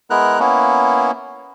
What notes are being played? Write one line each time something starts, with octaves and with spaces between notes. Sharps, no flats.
G#3 B3 E4 A#4 A#5 F#6
A#3 B3 C#4 E4